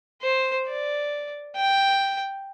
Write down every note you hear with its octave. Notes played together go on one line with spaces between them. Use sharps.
C5
D5
G5